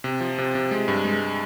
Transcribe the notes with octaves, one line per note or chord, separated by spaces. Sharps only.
C3
F3
C3
C3
G#3
G2
G#3